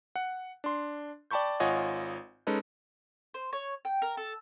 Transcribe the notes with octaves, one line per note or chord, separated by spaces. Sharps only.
F#5
D4 C6
D5 G5 A5 B5 C#6 G6
G#1 F4 C#5 D#5 F#5 G#5
G#3 C#4 D#4 A4 B4
C5
C#5
G5
A#4
A4